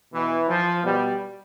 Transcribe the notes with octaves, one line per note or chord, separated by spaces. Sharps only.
B2 E3
F3
B2 G3